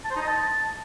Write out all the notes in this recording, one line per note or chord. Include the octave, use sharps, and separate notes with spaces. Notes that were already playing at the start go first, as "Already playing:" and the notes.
A5
C5
D#4
D#5
A5